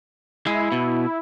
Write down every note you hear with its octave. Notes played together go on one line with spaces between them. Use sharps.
G#3 E4
B2